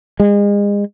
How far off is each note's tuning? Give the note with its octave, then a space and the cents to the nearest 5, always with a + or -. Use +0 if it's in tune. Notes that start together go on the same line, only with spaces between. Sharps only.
G#3 -35